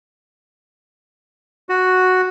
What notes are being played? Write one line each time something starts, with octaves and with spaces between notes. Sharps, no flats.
F#4